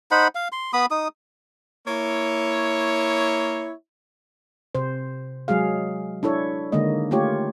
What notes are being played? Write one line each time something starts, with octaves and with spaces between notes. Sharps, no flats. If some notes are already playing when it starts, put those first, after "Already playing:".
D#4 C5 F#5 B5
F5
C6
B3 B5 D#6
D#4 D#6
A#3 E4 C#5
C3 C5
F#3 G#3 G#4 F5
D4 E4 A4 C#5
D3 D#3 G#3 A#3 D#5
A3 A#3 F4 G4 C#5